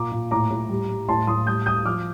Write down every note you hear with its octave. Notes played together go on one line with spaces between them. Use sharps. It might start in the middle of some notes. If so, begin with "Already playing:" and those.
Already playing: A#2 A#5 D6
A#2
A2 A#5 D6
A2
G3
G3
A2 A5 C6
A2 C6 D#6
G3 D#6 G6
G3 D#6 G6
F3 D6 F6